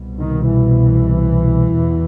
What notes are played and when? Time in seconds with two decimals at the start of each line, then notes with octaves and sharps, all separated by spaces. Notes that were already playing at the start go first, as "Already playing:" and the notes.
Already playing: C2 B2
0.19 D#3
0.50 E3
1.72 E2 B2